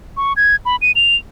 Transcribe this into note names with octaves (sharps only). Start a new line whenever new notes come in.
C#6
G#6
B5
D#7
F7